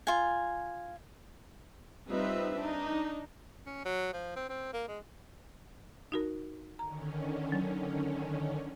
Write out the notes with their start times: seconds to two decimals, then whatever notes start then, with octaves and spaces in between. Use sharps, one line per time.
0.07 F4 G#5
2.09 G3 C4 D#4 F4 B4 E5
2.56 D4 D#4
3.66 C#4
3.85 F#3
4.13 F3
4.36 C4
4.49 C4
4.73 A#3
4.88 G#3
6.12 D#4 F#4 A#4
6.79 D3 D#3 C#4 A#5
7.52 F#3